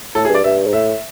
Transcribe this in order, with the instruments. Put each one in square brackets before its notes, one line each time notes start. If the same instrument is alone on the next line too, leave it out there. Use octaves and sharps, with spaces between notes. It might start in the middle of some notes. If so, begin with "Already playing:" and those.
[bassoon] A2 [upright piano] A4
[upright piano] G#4
[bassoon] G2
[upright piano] D5
[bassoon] G2 [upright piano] E5
[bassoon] G#2
[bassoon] A2 [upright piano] E5